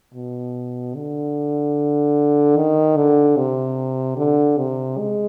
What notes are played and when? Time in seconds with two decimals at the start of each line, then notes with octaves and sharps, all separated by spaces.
0.14 B2
0.95 D3
2.56 D#3
2.96 D3
3.37 C3
4.17 D3
4.58 C3
4.98 G#3